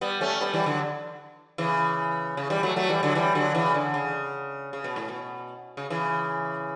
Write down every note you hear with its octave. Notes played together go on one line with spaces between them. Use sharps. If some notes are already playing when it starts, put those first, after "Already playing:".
G3 B3
A3 C#4
G3 B3
E3 G3
D3 F#3
C#3 E3
C#3
E3 G3
F#3 A3
F#3 A3
E3 G3
D3 F#3
E3 G3
D3 F#3
C#3 E3
D3
C#3
C#3
B2
A2
B2
C#3
C#3 E3